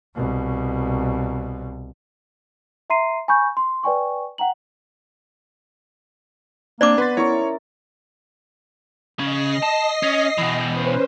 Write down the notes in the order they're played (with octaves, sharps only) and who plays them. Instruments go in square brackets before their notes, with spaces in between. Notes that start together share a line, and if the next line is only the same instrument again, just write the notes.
[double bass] C2 B2
[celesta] E5 A#5 C6 C7 D#7
G#5 B5 C#6 G6
C6
B4 D5 G5 G#5 C#6
F#5 G5 A#5 F#7
[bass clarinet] A#3 [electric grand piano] C4 D4 [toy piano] D5 D6
[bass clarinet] B3 [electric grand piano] B4 A6 [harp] C6 B6
[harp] C#4 E4 A#4 [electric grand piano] C#5 C#6
[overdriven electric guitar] C#3 C#4 [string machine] D#5 A#6 C7
[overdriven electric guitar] A5
C#4
[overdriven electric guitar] B2 E3 [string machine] G5
[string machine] C#4 B4 C5